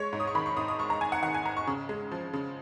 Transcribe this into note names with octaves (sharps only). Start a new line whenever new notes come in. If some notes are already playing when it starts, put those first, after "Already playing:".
Already playing: G#3 C#5
G#2
D#6
C#6
D#3 B5
C#6
G#2 D#6
D#6
G#1 C#6
A#5
G#1 G#5
F#5
D#3 F#5
G#5
G#1 A#5
C#6
C#3
G#3
F3
C#3